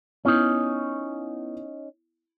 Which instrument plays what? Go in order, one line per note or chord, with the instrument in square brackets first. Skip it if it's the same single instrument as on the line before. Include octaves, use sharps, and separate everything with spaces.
[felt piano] B3 E4 [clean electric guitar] C#4 D#4